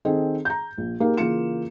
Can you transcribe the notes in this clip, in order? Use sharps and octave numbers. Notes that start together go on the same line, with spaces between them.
D#3 C4 G#4 A4 D#5
A#5 G6
A#1
A#3 D#4 G4 G#4 A#4 F5
C#3 E3 A#3 F4 C#7 E7